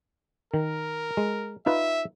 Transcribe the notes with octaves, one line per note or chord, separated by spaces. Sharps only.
D#3 A#4
G#3
D#4 F4 B4 E5